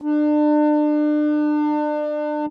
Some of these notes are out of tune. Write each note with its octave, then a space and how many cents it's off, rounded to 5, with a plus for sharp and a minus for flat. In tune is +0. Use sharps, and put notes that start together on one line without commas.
D4 +35